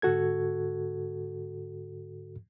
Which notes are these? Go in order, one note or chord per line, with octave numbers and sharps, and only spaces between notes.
G#2 D3 F#4 A4 G#6